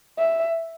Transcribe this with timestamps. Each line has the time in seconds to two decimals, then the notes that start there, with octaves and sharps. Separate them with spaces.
0.18 E5